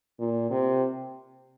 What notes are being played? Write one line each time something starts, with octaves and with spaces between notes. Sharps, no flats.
A#2
C3